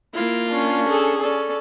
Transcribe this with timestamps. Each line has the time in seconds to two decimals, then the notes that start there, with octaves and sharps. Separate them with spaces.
0.14 A#3 E4 F4
0.49 C#4 D4
0.89 G#4 A4
1.21 C#4 A4 D5